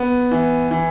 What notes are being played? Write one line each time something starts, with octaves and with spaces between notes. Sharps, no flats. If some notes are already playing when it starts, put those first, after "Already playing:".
Already playing: B3
E3
E3